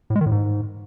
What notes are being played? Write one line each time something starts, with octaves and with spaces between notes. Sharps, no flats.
A2
G#3
D#3
A2
G#2